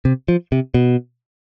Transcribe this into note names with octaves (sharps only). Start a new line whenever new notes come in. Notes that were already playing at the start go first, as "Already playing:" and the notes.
C3
F3
C3
B2